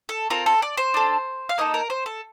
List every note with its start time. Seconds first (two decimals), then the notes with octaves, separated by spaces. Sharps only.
0.09 A4
0.30 C4 F4 A4 A#4
0.46 A4
0.62 D5
0.77 C5
0.94 D4 A4
1.49 F5
1.58 A#3 D#4 A4 D#5
1.74 A#4
1.90 C5
2.06 A4